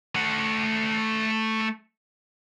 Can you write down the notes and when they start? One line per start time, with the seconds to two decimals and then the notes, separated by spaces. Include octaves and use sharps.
0.15 A3 F#5